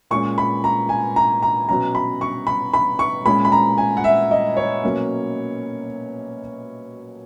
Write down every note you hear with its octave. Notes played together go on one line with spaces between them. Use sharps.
A#2 G#3 C#4 C#6
B5
A#5
G#5
A#5
A#5
B2 F#3 C#4 A#5
B5
C#6
B5
B5
C#6
A#2 G#3 C#4 B5
B5
A#5
G#5
F#5
E5
D#5
C#5
B2 F#3 A#3 C#4